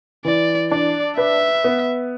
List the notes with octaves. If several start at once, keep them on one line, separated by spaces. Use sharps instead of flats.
E3 D5
D4 D5
B4 E5
B3